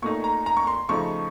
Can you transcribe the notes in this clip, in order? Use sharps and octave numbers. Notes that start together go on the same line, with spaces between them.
A#2 A3 D#4 C#6
A#5
A#5
C#6
C6
C#3 F3 A3 D#4 C#6